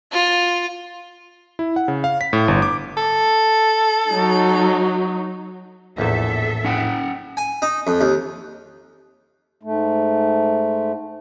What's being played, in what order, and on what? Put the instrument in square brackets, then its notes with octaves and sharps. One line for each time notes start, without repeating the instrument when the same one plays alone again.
[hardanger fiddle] F4
[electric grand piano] E4
F#5
C#3
F5
B6
A2
G1
D6
[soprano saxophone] A4
[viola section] F#3 D#4
[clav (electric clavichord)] A#1 E2 [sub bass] A2 [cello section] A4 E5
[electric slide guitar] C#4 F#5 G5
[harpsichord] G#5
D#4
F2
D#2
[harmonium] G#2 A3